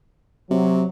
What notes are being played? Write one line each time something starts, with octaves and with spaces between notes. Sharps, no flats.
C3 F#3